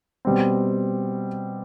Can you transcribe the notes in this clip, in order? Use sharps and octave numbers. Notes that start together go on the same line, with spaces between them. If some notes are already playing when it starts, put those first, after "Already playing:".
B2 G3 C4